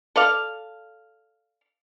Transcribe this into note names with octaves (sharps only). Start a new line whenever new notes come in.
A4 D5 F5